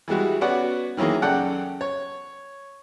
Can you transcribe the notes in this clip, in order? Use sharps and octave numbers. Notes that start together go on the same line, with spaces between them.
E3 G3 G#3 F#4
B3 C#4 F#4 D5 F#5
D#3 E3 F#3 A#3 G#4
F#2 C#3 A4 D5 F#5 G5
C#5